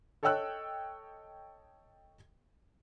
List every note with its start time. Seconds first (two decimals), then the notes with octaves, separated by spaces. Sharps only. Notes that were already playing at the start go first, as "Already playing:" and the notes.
0.23 A4 C#5 D#5 G5 E6 F#6